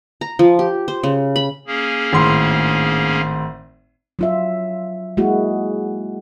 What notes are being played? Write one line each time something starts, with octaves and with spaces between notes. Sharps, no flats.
A#5
F3
G4
C5
C#3
B5
A#3 C#4 G#4
G#1 A2 C6
F#3 F4 E5
G#3 A#3 E4 F#4